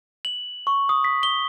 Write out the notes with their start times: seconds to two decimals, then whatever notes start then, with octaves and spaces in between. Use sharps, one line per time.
0.25 F#7
0.67 C#6
0.89 D#6
1.04 B6
1.23 G7